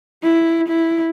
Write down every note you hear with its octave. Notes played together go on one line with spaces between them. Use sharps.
E4
E4